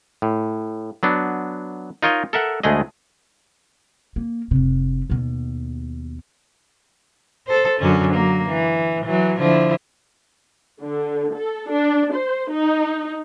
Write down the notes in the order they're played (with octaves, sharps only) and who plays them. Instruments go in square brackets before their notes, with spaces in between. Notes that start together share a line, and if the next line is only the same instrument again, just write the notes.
[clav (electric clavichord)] A2
F#3 B3 D4
D#4 F4 A#4 C#5 D#5
A4 A#4 E5 F#5
D2 G#3 A3 G#4 D#5
[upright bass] A#3
F1 C3
D#2 B2
[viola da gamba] A4 C5
F#2 D3 C#4
F#3 A#3
E3
E3 F#3
D3 F3 E4
[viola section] D3
A4
D4
C5
D#4